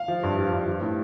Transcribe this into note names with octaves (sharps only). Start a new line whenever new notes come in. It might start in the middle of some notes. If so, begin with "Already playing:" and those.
Already playing: F5
F3
G2
F3
G2
F3
A2